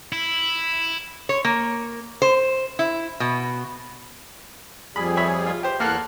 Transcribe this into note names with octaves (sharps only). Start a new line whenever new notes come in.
E4
C#5
A#3
C5
E4
B2
F2 G3 G#4 B5
C#5 E5 B5
F4
G4 C5
E2 A#3 A4 F#5 F6 F#6